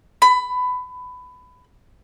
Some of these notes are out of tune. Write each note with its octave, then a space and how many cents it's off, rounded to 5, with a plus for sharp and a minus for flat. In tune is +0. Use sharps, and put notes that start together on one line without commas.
B5 +20